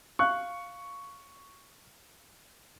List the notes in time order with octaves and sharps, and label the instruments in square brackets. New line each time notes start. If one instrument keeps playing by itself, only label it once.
[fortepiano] F5 F#6 [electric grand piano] C#6